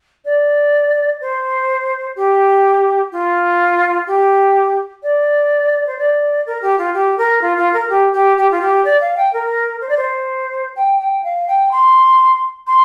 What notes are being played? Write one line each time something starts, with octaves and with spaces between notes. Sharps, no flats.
D5
C5
G4
F4
G4
D5
C5
D5
A#4
G4
F4
G4
A#4
F4
F4
A#4
G4
G4
G4
F4
G4
D5
F5
G5
A#4
C5
D5
C5
G5
G5
F5
G5
C6
C6